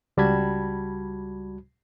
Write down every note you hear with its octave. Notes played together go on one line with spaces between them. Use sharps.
C#2 G3 F#4 A5 B5 G#6